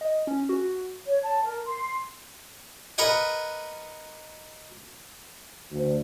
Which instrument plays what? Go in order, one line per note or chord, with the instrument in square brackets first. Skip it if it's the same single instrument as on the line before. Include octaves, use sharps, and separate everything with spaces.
[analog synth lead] D#5
C#4
F#4
[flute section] C#5
A5
A#4
C6
[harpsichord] A#4 B4 D#5 F#5 G#5
[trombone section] D2